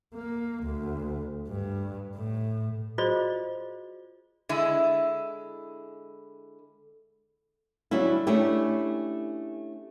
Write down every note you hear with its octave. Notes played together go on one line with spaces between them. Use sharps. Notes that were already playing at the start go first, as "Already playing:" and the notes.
A#3
D2
G2
A2
F4 F#4 G#4 C5 D5 D#5
D3 G#3 E4
D3 F#3 G3 C#4 E4
A3 C#4 D4 E4 G4 G#4